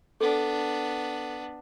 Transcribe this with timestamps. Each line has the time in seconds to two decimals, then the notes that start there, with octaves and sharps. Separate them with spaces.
0.21 B3 D4 A4